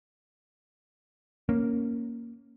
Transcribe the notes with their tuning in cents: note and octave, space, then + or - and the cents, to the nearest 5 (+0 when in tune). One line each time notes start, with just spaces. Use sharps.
A#3 +0 C#4 +0